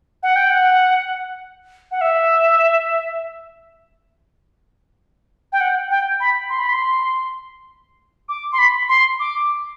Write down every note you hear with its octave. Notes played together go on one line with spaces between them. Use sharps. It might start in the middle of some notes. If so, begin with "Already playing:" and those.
F#5
G5
F#5
F#5
E5
G5
F#5
G5
B5
C6
B5
C6
D6
C6
B5
C6
D6